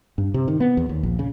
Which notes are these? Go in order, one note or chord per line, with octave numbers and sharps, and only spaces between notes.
G2
C3
D#3
B3
E2
D#2
A#1
C#3